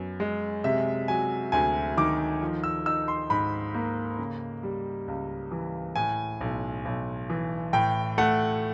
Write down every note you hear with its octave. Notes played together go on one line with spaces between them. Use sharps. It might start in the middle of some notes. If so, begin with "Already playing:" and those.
Already playing: F#2 B3
G#3
C3 E5
F#3 G#5
D2 G#5
D#3 D6
F3
E6
D#4 E6
C6
G#2 B5
A#3
C#3
G3
C#2
E3
A2 G#5
B1
B1
E3
A2 G5
A3 F#5